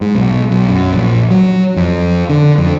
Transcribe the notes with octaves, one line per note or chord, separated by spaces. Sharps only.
G#2
B1
B1
F#2
A#1
F#3
F2
D3
F2